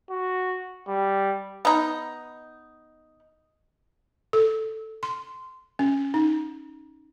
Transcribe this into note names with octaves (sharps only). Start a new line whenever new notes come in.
F#4
G3
B3 D#4
A4
C6
C#4
D#4